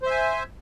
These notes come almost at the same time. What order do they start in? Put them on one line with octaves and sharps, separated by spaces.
C5 E5 G#5